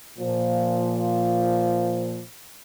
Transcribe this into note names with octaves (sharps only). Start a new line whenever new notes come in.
A#2 F3